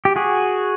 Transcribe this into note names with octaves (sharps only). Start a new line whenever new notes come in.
G4
F#4 G#4